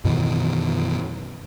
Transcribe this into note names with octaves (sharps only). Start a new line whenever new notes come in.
F#2 B2 D#3 E3